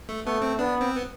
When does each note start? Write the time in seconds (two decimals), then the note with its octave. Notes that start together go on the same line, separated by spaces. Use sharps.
0.09 A3
0.26 A3 B3
0.42 C4
0.59 B3 D4
0.81 C4
0.96 B3